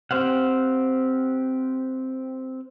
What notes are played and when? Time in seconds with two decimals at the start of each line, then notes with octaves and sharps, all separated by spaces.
0.11 C4 G4 C5 F5 F#5